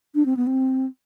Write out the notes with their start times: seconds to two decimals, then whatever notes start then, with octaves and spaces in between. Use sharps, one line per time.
0.15 D4
0.26 C4
0.37 B3
0.47 C4